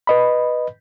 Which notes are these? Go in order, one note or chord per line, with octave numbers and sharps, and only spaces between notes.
B4 D#5 B5